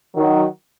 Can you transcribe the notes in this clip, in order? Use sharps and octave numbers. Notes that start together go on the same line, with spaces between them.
D#3 F#3